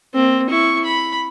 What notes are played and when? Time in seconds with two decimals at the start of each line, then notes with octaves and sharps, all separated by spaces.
0.14 A#3 C4
0.49 E4 C#6
0.85 B5